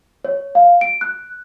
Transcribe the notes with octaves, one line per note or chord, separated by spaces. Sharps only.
C#5
F5
D7
F#6